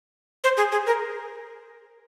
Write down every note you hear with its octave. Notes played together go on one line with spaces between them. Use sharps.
C5
G#4
G#4
A#4